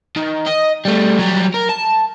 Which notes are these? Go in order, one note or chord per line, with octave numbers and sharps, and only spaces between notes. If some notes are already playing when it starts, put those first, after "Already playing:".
D#3
D#5
G3 A3
F#3 G3
A#4
A5